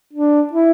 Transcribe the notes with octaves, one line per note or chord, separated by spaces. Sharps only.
D4
E4